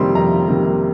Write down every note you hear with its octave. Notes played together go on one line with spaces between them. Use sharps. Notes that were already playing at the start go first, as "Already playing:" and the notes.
Already playing: F2 C3 D#3 G3 A#3 C6
F2 A#5
C3 D#3 G3 A#3